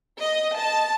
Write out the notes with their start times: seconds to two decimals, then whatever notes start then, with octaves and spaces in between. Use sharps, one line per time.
0.21 D#5
0.58 A5